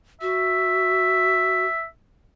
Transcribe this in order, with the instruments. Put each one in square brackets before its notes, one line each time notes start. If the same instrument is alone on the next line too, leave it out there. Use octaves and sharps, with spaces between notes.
[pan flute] F#4 [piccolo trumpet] E5